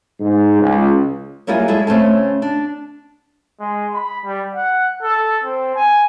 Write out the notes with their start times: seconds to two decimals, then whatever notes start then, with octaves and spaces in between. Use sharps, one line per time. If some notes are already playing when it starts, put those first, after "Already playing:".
0.20 G#2
0.59 C#2
1.47 F#3 G3 A#3 E4 F4 G#4
1.68 G#3 E4 G#4 A4
1.87 C#3 A3 C4 C#4 A5
2.42 D4
3.60 G#3
3.94 B5
4.25 G3
4.55 F#5
5.02 A4
5.44 C4
5.75 G#5